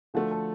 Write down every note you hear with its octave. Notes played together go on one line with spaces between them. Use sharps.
D3 F3 A3 F#4
A4